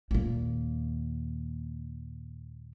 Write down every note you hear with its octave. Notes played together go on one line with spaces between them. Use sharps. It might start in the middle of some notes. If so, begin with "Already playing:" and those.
D#2 A#2